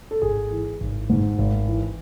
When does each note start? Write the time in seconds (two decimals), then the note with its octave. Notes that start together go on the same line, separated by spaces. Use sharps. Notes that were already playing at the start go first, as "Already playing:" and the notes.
0.11 A4
0.22 G#1 G#4
0.51 E3
0.80 G#1
1.10 G#2
1.38 G#1
1.67 E3